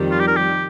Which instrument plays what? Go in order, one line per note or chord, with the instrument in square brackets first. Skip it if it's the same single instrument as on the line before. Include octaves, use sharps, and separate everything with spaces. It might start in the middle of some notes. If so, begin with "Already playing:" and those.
Already playing: [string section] F2 D#3 G3
[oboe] F4
G4
A#4
G4